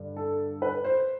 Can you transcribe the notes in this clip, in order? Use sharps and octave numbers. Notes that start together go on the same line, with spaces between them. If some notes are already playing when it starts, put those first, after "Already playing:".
Already playing: G2 D3
A4
B4
C5